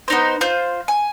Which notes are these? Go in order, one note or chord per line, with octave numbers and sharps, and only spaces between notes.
B3 D#4 C5
F4 C5 G6
G#5